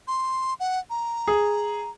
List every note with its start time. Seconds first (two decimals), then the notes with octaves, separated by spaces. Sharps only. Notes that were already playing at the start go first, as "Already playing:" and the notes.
0.08 C6
0.60 F#5
0.90 A#5
1.28 G#4